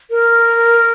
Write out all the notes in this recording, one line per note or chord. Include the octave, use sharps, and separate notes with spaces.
A#4